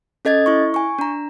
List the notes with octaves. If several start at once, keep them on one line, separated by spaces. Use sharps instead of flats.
C#4 A4 D#5 G#6 A6
E4 C#6
G#5 C#6
D4 A#5